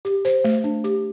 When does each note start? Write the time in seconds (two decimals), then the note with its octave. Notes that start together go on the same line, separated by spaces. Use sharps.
0.05 G4
0.25 C5
0.44 A3
0.64 D4
0.84 G4